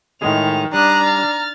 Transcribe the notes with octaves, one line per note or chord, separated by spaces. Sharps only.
A2 D#3 G#3 G#4 F7
G3 D4 A#5 D#6 F#6
F6 A6